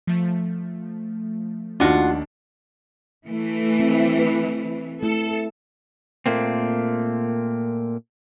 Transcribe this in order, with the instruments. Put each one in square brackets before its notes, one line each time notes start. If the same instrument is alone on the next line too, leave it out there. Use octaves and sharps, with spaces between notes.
[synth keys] F3 A3
[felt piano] D#2 D4 [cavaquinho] F4 F#4 F#5
[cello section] E3 A3
[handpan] C4
B4
[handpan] A3 E4 [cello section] A4
[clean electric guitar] A#2 A3 A#3 C4